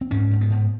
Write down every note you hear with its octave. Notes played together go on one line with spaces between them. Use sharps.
C4
G#2 C#4
G#2
B3
G#2